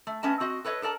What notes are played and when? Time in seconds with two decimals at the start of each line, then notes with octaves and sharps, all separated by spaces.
0.07 A3
0.23 A3 B3 C#4 D#5 A5
0.40 C4 F#4 D#5
0.65 A4 B4 C#5 D#5
0.82 A4 A#4 D5 A5